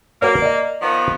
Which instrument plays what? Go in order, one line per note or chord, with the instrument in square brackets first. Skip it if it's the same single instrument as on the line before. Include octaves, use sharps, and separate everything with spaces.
[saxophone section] A#3 [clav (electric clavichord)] F#4 B4 C#5
[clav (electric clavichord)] D5 D#5
[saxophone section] D#3 F3 B3